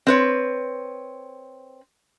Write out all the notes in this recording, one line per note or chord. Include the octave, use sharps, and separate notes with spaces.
C4 B4 C#5